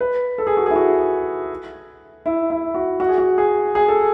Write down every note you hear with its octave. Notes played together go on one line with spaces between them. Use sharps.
B4
A4
G#4
F#4
G#4
E4
F#4
E4
E4
F#4
F#4
G#4
F#4
G#4
G#4
A4